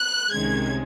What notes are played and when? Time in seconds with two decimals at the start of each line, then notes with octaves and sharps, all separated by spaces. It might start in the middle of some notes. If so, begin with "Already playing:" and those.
Already playing: F#6
0.31 C2 C3 D#3 G#3 C#4 G#6